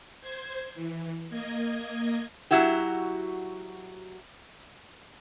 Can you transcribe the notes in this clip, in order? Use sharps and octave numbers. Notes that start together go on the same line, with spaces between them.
C5 G#6
E3
A#3 D#5 G#6
F#3 E4 F#4 G4